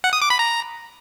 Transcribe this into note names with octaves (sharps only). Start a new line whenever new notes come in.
F#5
D#6
D6
B5
A#5